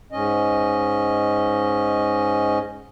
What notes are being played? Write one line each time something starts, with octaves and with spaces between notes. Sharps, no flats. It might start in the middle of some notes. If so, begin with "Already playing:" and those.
G#2 C#4 D#5